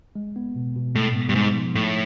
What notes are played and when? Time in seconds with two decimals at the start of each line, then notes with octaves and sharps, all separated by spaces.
0.15 G#3
0.36 B3
0.56 B2
0.75 B2
0.95 A2 G#3
1.15 B3
1.29 G2
1.35 G#2 D#4
1.55 F3
1.75 A2 A3